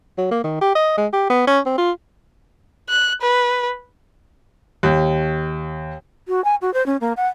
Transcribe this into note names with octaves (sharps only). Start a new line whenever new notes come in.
F#3
A#3
D#3
G4
D#5
G#3
G4
B3
C#4
C4
F4
F#6
B4
D#2
F#4
G#5
F#4
C5
C#4
A#3
F#5